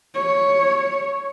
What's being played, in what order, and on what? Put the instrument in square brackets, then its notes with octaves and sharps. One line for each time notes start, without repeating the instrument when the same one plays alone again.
[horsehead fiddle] C#5